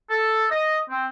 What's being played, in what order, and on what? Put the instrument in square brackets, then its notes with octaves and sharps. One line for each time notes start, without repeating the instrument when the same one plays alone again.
[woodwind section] A4
D#5
C4